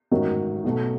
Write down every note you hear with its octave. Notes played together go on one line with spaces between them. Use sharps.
A1 G#2 D#3 F#3
B1 B2 F#3 A3